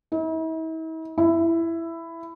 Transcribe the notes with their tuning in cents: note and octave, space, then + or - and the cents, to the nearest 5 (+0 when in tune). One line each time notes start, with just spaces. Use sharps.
E4 -45
E4 +10